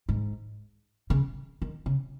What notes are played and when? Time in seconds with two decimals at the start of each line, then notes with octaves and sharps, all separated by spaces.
0.09 G#2
1.10 C#3
1.62 D#3
1.86 C#3